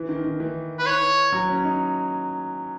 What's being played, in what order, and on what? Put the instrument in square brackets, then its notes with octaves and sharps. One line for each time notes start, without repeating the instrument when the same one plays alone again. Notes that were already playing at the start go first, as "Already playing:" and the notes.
Already playing: [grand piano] E3
D#3
D#3
E3
[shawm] B4
C#5
[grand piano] F#3
C#4
D#4